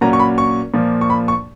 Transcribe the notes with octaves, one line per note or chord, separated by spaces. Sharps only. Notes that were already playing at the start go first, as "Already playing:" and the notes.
A#2 F#3 A#3 C#4 A#5
C#6
B5
C#6
A#2 F3 A#3
C#6
B5
C#6